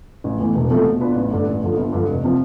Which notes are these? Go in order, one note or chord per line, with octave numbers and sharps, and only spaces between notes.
A1
A2 E3 B3
E1
E2 C3 F3 A3
B2
B3 D4 F4 B4
A1
G2 D3 A3 D4
A1
G2 D3 F3
G1
G2 D3 F3
F1
C3 F3 C4